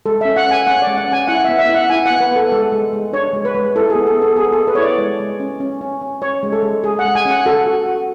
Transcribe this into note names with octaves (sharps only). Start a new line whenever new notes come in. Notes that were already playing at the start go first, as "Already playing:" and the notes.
G#3 A4
E5
C#4
F#5
C#4
G#5
C#4 F#5
D5
G#3
F#5
C#4 G#5
E4 F#5
E5
B3
E5
E4
F#5
E4 G#5
F#5
B3
B4
B3 A4
G#3 A4
G#3
G#3
D4 C#5
G#3
B4
G#3
E4 A4
G#4
B3
A4
B3
A4
B3 G#4
A4
B3
B4
E4 C#5
D5
G#3
G#3
C#4
C#4
C#4
C#4
C#4 C#5
G#3
A4
G#3
G#3 G#4
F#5
G#3
G#5
C#4
F#5
F#4 A4
F#4
F#4